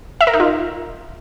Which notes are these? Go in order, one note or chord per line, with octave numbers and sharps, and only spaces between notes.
E5
A#4
D#4
F4